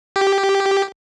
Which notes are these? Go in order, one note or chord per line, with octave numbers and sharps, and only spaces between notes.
G4